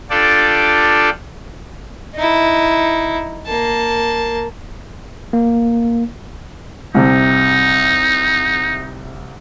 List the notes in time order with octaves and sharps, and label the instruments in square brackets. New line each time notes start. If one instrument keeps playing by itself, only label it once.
[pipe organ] D4 F4 G4 A4 D5
[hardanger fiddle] D#4 E4
A#3 A5
[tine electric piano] A#3
[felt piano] C2 C3 [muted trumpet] D#4